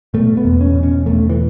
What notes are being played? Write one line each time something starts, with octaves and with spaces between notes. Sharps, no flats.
B2 A3
B3
E2
C#4
B2
C#4
E2 A3
E3